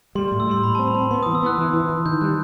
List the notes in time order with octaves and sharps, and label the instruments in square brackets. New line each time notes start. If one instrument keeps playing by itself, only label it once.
[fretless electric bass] G3 [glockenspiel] C6
[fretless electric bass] A2 [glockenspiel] C6
[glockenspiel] E6
[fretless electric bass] G3 [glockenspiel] C6
[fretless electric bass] A2 [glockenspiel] B5
[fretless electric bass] C4 [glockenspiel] A5
[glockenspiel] B5
[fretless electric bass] C4 [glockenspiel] C6
[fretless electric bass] B3 [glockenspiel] C6
[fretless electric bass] E3 [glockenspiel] D#6
[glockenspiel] E6
[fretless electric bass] B3 [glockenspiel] F#6
[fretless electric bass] E3
E3
E3
[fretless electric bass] D#3 [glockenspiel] G6
[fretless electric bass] G3 [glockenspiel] F#6